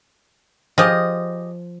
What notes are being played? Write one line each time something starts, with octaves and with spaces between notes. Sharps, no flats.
F3 G4 G#4 D#5